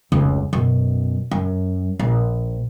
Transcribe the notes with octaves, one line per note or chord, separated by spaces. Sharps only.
F1 C#2
F#2 B2
F#2
A#1